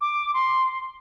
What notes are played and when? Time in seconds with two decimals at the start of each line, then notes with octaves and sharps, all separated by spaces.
0.01 D6
0.34 C6